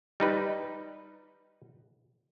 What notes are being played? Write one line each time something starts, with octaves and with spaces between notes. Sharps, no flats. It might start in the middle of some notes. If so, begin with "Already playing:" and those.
G3 D#4 B4